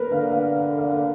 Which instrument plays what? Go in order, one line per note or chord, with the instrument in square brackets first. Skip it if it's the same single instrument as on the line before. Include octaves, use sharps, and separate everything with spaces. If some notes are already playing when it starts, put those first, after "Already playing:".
Already playing: [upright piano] A#4 B4
[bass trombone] D3 [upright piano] F5
[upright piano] F5
F5